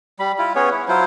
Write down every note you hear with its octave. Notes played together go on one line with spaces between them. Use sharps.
G3 B5
E4 F4
B3 C#4 G#4 C#5
E4
F#3 E4 F4 C5